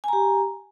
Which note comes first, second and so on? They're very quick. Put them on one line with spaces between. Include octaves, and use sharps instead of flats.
G#5 A#5 G4